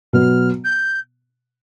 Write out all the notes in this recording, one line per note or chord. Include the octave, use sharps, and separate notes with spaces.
B2 F#3 B3 F6
G6